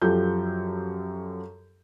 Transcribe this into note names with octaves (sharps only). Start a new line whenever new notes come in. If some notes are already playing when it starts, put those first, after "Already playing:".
F#2 F3 G4 A4 G6